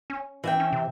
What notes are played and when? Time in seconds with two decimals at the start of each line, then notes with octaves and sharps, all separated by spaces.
0.10 C#4
0.44 E3 E5 G5
0.60 C#4
0.73 C3